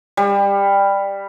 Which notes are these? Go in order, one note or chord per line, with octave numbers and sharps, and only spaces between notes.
G3